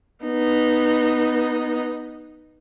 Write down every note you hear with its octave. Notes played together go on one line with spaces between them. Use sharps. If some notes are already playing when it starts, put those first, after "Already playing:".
B3 D#4